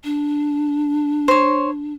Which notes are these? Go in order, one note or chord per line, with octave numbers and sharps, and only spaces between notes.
D4
C5 C#5